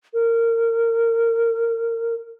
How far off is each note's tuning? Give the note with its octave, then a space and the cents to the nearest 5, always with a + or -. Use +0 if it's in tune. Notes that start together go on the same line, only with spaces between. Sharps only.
A#4 -25